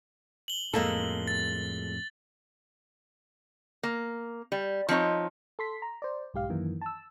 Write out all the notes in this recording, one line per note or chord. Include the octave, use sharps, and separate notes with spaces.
F#7 G7
F2 A2 G#3 A#3 A4
A6
A#3
G3
F3 C4 D#4 C#5
A4 C6 B6
A#5
C5 D5
B1 G#2 G4 F5
F#2 D#3 E3 A#3
A5 E6